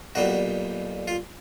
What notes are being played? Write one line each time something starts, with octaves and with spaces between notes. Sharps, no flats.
B1 A#2 G3 F#4
F4